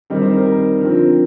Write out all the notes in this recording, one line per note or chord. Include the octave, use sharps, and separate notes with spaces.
D#3 G3 C4 D#4 A#4
C5
A#4
A#4
D3 F3 C4 A#4